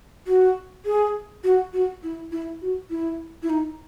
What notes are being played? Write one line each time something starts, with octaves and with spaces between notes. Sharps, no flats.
F#4
G#4
F#4
F#4
E4
E4
F#4
E4
E4
D#4